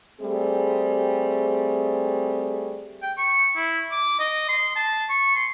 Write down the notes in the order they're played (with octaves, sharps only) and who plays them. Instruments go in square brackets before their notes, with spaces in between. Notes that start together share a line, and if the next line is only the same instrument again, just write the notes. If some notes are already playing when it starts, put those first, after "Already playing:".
[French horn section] G3 A3 C4 G#4
[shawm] G5
C#6
E4
D6
D#5
C6
A5
C#6
C6